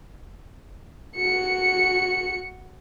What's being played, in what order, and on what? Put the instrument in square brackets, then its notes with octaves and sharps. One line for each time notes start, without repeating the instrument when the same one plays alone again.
[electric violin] F#4 C#7